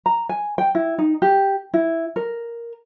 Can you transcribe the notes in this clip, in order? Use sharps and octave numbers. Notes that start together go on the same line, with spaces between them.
A#5
G#5
G5
E4
D#4
G4
E4
A#4